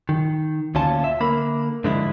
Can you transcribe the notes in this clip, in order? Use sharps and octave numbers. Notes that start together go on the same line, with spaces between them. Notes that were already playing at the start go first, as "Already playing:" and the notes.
D#3
D2 A#2 C#4 F4 A5
E5
D3 A#3 A#4 B5
G#2 D3 F3 G#3 D4 E4